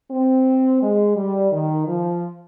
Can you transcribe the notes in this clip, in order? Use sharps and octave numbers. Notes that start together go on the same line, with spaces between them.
C4
G#3
G3
D#3
F3